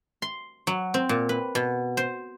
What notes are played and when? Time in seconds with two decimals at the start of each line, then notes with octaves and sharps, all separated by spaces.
0.22 C6
0.67 F#3
0.94 C4
1.09 A#2
1.29 B4
1.55 B2
1.97 C5